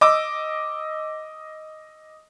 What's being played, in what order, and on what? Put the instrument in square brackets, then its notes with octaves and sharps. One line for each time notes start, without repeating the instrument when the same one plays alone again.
[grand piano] D#5 D6 E6